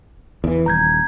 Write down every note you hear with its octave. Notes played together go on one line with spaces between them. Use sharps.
E2 E3
D#1 A#5 G6 G#6